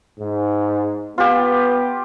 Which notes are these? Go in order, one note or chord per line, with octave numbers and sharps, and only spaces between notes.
G#2
B3 F4 G4